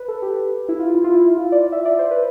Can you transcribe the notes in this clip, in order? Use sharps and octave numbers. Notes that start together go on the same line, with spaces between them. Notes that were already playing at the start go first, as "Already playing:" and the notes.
Already playing: B4
A4
G4
E4
F4
E4
F4
E4
F4
D5
E5
D5
C5
B4